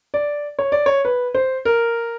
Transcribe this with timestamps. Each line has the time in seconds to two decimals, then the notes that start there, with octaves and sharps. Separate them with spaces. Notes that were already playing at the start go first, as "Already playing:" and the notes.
0.14 D5
0.59 C#5
0.72 D5
0.86 C#5
1.05 B4
1.35 C5
1.65 A#4